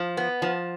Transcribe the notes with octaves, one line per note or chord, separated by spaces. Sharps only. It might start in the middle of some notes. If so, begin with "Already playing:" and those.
Already playing: F3
B3
F3